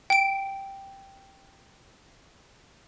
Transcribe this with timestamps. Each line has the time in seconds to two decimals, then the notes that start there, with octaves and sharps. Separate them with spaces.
0.10 G5 D7